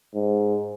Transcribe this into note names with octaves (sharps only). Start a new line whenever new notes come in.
G#2